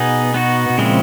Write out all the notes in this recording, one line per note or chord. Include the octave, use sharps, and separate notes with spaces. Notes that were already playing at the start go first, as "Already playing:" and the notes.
Already playing: B2 B3 D#4 G#4
B3 D#4 F#4
B2
A#2 C#3 F3 G#3 C4 E4